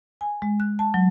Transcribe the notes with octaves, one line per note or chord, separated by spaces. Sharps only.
G#5
G#3
F#6
A5
F#3